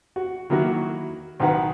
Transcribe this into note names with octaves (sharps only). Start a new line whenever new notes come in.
F#4
D#3 F#3 A#3 E4 F#4 A#4
B1 D#3 B4 F#5 A#5